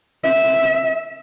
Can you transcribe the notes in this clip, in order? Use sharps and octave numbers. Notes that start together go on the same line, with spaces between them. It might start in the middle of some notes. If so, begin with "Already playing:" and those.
E5